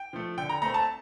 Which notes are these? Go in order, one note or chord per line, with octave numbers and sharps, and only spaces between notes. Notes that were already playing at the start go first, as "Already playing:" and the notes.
Already playing: G5
F3 A3
D3 G5
A#5
A3 C4 A#5
A5